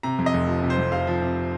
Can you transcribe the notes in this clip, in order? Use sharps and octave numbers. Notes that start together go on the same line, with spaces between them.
C3 A#5
F2
D#5
F1
F3
C3
C5
F2
F1 F5
F3
C3